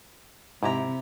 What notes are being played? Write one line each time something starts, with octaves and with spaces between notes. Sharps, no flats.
G#2 C3 E4 G4 A#5